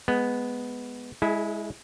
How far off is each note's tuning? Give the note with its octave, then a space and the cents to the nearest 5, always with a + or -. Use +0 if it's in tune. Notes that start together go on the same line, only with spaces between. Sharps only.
G#3 +0 B3 +0
G#3 +0 E4 -10 G#4 +45